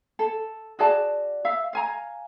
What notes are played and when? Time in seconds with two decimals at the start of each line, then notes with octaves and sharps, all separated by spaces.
0.19 A4
0.79 F#4 G#4 D5 A5
1.45 E5 F5
1.73 F5 G#5 A#5